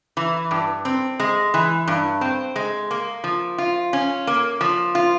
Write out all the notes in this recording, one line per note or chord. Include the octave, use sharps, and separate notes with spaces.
E3
G2
C4
G#3
E3
G2
C4
G#3
A#3
F3
F4
C#4
A#3
F3
F4